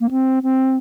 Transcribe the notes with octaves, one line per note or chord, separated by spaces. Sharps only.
A#3
C4
C4